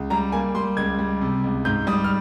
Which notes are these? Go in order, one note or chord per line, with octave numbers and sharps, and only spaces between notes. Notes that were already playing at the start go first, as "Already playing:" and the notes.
Already playing: C#2
G3 A#5
A#3 G#5
G3 C6
C#2 G#6
G3
C3
C#2
G#2 G6
G3 D#6
F6